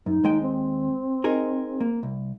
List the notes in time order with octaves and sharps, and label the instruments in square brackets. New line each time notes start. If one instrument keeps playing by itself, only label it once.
[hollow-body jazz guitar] F#2 [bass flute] D#4
[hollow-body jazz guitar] D#2 G#3 G5
[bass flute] C4
[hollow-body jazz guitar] D#4 G#4 A#4
A#3
C2